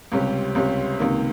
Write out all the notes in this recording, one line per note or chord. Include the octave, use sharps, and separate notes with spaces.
C#2 C3 G3 C#4 G4
C#2 C3 G3 C#4 G4
C#2 C3 D#3 A#3